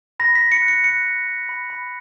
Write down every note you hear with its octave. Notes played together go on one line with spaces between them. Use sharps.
B5 A#6
B6
B5
C#7
F#6
C#7
F#6 C#7
B5
B5
B5
B5